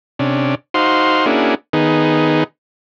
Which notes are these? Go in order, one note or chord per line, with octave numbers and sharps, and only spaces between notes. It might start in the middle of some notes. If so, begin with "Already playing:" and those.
C3 C#4 D4
D#4 F#4 C5 F5 C6
A#3 C#4 D4 E4 F#4 G#4
D#3 B3 D#4 G#4